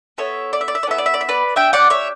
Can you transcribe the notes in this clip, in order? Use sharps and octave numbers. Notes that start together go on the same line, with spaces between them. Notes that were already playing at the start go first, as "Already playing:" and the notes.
B3 E4 A4 C#5 E5
D5
E5
D5
E5
D5
B3 E4 A4 E5
D5
E5
D5
E5
B4 D5
D4 G4 E5 G5
D5 F#5
C#5 E5